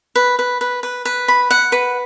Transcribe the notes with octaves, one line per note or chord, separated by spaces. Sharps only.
B4
B4
B4
B4
B4
B5
F#5
B4